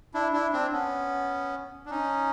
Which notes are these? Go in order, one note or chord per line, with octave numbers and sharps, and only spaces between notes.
D4 E4
D4 E4
C4 D4
B3 C#4
D4
C#4 D#4